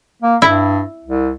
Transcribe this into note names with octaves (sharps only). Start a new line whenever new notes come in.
A#3
G2 E4
C2